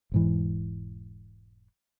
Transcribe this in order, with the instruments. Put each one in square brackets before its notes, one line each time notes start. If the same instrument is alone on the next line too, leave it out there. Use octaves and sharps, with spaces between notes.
[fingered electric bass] E1 G#2 E3